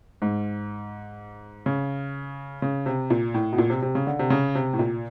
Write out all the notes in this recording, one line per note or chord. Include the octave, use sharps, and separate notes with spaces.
G#2
C#3
C#3
C3
A#2
A2
B2
A#2
C3
C3
C#3
D3
C3
C#3
C3
A2
A#2